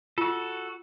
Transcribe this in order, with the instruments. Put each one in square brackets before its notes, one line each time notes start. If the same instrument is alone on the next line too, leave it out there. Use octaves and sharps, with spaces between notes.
[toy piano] F4 [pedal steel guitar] F#4 A4